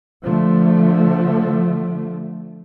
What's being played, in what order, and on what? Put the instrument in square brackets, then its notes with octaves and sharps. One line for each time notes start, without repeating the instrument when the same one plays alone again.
[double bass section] D3 F3 A3